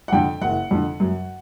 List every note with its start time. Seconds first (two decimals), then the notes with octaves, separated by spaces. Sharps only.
0.08 F#5
0.13 F2 D3 G5
0.42 F#1 F#5
0.71 F2 D3
1.00 F#2